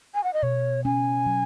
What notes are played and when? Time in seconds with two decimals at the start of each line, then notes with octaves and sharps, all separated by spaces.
0.14 G#5
0.24 F#5
0.33 D#5
0.43 B2 C#5
0.85 C#4 G#5
1.26 F#3